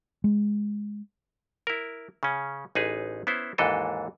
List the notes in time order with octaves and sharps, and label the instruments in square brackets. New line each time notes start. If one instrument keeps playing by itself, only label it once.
[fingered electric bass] G#3
[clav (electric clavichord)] E4 A#4
C#3 C#4
A1 D#4 G#4 B4
B3 C#4 E4 C5
D#2 G#2 E3 D4 A4 D#5